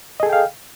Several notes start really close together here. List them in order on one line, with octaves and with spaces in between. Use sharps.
D#5 G#4 A4 G5 F5